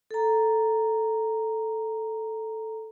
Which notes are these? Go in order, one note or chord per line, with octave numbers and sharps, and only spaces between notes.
A4 A#5